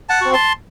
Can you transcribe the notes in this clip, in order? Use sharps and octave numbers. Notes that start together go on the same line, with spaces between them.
F#5 A5
C4 F#4
A5 C6